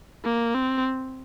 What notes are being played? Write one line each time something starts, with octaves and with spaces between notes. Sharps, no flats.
A#3
C4